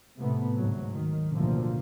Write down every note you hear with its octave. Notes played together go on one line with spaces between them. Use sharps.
A2 C3 A3 B3
D2 G#2 F#3
D#3
A1 D2 B2 D3 F3 A#3